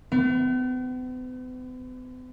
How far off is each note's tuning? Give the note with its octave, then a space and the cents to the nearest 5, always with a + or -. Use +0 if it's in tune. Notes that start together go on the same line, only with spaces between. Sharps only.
B3 +45